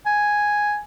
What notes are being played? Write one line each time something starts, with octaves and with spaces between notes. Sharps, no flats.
G#5